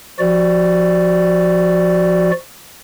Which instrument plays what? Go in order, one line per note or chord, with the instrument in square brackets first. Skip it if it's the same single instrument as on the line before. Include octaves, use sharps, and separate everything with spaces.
[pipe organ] F3 F#4 D5